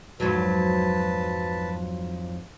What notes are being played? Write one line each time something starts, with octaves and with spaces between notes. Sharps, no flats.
F2 G#2 F#3 B4 A5